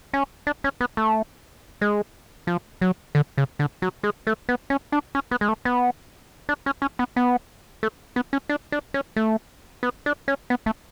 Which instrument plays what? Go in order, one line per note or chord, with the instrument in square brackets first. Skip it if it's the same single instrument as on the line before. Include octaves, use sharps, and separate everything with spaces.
[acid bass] C#4
D4
C#4
B3
A3
G#3
F3
F#3
D3
C#3
D3
F#3
G#3
A3
B3
C#4
D4
C#4
B3
G#3
A3
B3
D4
C#4
C#4
B3
B3
A3
B3
C#4
D4
D4
C#4
A3
B3
D4
C#4
B3
A3